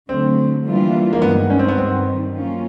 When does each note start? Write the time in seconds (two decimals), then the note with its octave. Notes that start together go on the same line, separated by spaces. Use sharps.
0.09 D3 F#3 A3 C4
0.66 E3 G3 A#3 D4 F4
1.13 A#3
1.22 G2 D#3 G#3 B3
1.50 C#4
1.59 C4
1.68 B3
1.78 G2 D#3 G3 C4
2.35 F#3 A#3 C#4 F4